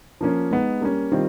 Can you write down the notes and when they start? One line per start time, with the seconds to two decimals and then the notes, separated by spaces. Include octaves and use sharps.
0.21 F3 A#3 C#4
0.51 G#3 B3 D#4
0.81 G3 A#3 C#4
1.12 D#3 G3 C4 F4